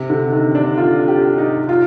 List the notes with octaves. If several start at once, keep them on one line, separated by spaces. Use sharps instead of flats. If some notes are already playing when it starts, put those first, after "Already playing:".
Already playing: C3
D3
D#3
D4
F4
G4
D#4
F4